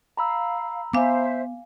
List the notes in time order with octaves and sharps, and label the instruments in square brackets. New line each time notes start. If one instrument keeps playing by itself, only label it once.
[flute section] F5 [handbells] A#5 B5 E6
[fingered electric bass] B3 [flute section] C5 E5 [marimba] F5 G#5 D6